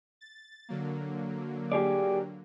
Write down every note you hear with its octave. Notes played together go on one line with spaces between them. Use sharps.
A6
D3 F#3 A#3
G4 G#4 D5